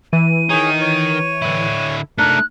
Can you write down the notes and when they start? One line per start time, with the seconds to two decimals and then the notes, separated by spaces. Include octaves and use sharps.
0.13 E3 D#7
0.50 D#3 D#4 G#4 C#5
0.81 C#5
1.42 D3 E4
2.18 A3 D4 D#4 A#4 F#6